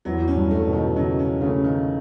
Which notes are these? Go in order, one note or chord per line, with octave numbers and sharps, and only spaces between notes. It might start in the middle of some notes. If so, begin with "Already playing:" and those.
E2 F#3
C#4
G2
A3
B2
D#3
C#3 F#3
C#4
C#3 A3
D#3